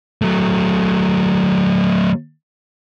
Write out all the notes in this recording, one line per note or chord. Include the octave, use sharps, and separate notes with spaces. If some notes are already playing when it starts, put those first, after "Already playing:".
F#3 A3